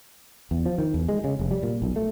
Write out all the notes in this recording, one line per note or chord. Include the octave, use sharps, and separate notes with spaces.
E2
F3
D#3
E2
G#3
C#3
F1
G3
A#2
B1
A3